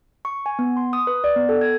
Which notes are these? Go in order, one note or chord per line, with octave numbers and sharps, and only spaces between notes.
C#6
G#5
B3
C6
D#6
B4
D5
B3
A4
G#6